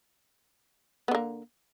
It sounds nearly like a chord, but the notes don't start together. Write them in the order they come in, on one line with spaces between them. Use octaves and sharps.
B3 D3 A#3